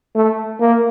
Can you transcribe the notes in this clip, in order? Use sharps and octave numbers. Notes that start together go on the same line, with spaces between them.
A3
A#3